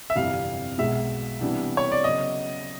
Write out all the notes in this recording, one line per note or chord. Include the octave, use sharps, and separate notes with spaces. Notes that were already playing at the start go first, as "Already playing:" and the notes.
E5
G1 F2 C3 E3 G3 F5
B1 B2 G#3 E5
C3 E3 G3 B3 D4
C#5
D5
C#3 F#3 B3 D#5